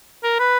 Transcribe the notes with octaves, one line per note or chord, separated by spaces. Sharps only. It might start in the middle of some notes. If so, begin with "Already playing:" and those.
A#4
B4